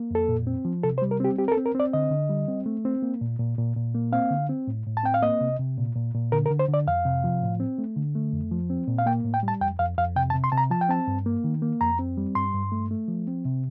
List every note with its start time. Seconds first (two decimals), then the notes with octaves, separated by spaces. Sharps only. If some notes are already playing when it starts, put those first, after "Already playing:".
Already playing: A#3
0.11 F2 A4
0.29 A#2
0.47 C4
0.65 F3
0.84 C3 A4
0.98 C5
1.02 G3
1.11 A#4
1.20 C4 G4
1.38 C4 G4
1.48 A#4
1.52 A4
1.57 C4
1.66 A#4
1.75 C4 D5
1.93 D3 D#5
2.11 D3
2.29 G3
2.48 C4
2.66 A3
2.85 C4
3.02 A#3
3.21 A#2
3.39 A#2
3.58 A#2
3.76 A#2
3.94 A#3
4.12 C4 F5
4.31 D3
4.49 C4
4.67 A2
4.86 A2
4.97 A5
5.04 C4 G5
5.14 F5
5.22 A#3 D#5
5.41 C3
5.59 C3
5.77 A#2
5.95 A#2
6.14 A#2
6.32 D3 A#4
6.46 A#4
6.51 D3
6.59 C5
6.68 D3
6.74 D5
6.87 F2 F5
7.05 C3
7.24 F3
7.42 A2
7.60 C4
7.78 A3
7.96 D3
8.15 A3
8.33 F2
8.51 F3
8.70 C4
8.88 A#2
8.98 F5
9.06 A#3 G5
9.25 A2
9.34 G5
9.43 G3
9.48 A5
9.61 F2 G5
9.79 F2 F5
9.98 F2 F5
10.16 C3 G5
10.30 A5
10.34 C3
10.44 C6
10.52 C3 A5
10.58 A#5
10.71 F3 A5
10.81 G5
10.89 C4 A5
11.07 G2
11.26 A#3
11.44 D#3
11.62 A#3
11.81 F2 A#5
11.99 C4
12.17 G3
12.35 G2 C6
12.54 G2
12.72 A3
12.91 A3
13.08 F3
13.27 C4
13.45 C3